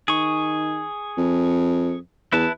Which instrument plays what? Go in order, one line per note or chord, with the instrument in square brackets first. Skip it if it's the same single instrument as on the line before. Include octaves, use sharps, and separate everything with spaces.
[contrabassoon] D#3 [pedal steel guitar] G#4 C#6
[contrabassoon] F2
[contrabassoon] E2 [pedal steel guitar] E4 B4 A5